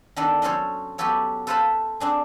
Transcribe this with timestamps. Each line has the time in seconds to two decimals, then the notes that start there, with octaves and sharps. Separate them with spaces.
0.16 D#3 B3 D4 A4 D5
0.42 F#3 C#4 F#4 A4 C5 C#5
0.98 F#3 B3 F#4 G4 A4 C#5
1.47 A4 B4 C5 F5 A5 B5
2.00 C4 D4 G#4